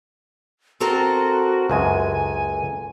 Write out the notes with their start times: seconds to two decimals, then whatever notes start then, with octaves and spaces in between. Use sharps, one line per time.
0.80 C4 F#4 A4 A#4
1.70 C#2 F#2 G#3 G#5